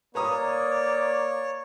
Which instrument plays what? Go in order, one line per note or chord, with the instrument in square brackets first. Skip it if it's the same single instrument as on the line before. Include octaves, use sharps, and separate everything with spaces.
[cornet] A#3 [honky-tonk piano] B4 A#5 D#6 [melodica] C#5 [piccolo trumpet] D5